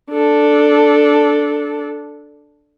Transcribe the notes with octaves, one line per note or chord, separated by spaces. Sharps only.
D4 A4